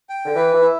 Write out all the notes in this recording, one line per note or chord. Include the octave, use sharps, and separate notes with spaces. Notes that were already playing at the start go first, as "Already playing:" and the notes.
G5
D3
E3 B4
E3
E4